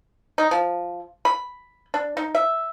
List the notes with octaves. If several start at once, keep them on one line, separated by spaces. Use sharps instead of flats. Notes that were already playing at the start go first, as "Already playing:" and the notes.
D#4
F3
B5
D4
D#4
E5